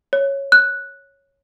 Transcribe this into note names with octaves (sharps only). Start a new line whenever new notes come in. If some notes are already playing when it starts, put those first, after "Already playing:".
C#5
F#6